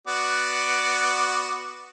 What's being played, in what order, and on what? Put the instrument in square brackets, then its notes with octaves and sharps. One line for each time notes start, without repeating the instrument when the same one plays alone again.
[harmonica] B3 F#4 D5